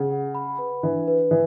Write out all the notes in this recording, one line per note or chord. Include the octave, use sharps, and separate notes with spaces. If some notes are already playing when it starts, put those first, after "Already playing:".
Already playing: C#3 F#5
F#5
B5
B4
E3 D4
B4
E3 B4